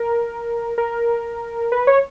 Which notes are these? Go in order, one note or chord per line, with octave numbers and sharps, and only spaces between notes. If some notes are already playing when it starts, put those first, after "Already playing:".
Already playing: A#4
A#4
B4
C#5